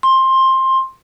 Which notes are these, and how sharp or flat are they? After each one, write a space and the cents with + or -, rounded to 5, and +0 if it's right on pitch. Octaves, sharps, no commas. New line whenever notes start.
C6 +15